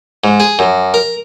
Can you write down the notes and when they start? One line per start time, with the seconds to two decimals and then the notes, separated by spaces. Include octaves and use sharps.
0.24 G#2
0.40 G#4
0.59 F#2
0.94 A#4